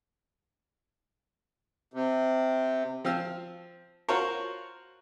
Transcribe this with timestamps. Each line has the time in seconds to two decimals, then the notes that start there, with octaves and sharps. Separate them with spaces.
1.94 C3
3.05 F3 C4 F5 E6
4.08 F4 F#4 A#4 C5 C#5